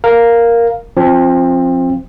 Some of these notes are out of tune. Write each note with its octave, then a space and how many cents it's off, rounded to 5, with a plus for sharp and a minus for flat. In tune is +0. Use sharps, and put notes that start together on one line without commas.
A#4 +0 F5 +0
F3 +0 C4 +25